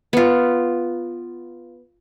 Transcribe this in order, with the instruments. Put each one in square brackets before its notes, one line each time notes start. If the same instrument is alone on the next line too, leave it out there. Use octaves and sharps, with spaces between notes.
[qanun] B3 F4